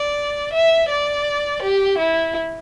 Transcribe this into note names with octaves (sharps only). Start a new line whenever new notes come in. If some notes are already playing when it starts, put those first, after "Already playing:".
Already playing: D5
E5
D5
G4
E4